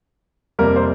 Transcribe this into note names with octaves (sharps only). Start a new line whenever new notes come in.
F2 C3 G3 A#3 A#4
C5